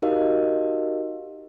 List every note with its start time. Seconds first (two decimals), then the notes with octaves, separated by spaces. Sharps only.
0.02 D#4 F#4 G4 A#4 D#5 F5